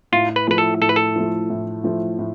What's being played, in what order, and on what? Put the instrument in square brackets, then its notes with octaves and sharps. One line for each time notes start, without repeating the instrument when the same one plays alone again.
[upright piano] A2 [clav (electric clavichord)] F4
[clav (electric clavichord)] B4
[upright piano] F3 A3 [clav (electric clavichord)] B4
[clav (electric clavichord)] A4
[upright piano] A2 [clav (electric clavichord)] A4
[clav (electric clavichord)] B4
A4
[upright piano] F3 A3
A2
F3 A3
A2